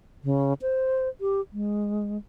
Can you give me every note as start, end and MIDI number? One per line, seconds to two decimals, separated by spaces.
0.24 0.53 49
0.62 1.08 72
1.21 1.41 67
1.53 2.17 56